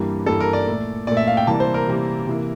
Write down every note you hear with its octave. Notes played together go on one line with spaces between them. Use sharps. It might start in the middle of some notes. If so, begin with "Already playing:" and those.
Already playing: G2 E3 G3 A#3
G2 E3 G3 A#3 A4
A#4
D5
A#2 A3
A#2 A3 D5
E5
F5
G5
C3 E3 G3 A#3 A5
C5
A#4
C3 E3 G3 A#3
C3 E3 A#3